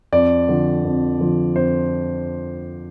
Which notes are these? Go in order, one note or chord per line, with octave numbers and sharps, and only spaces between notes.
F2 D5
D3 F3
F2
D3 F3
F2 C5